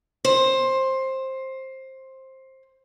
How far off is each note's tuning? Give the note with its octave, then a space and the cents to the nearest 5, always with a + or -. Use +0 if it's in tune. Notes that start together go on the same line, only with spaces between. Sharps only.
C5 +15